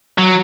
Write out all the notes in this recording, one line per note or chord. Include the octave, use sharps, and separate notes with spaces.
F#3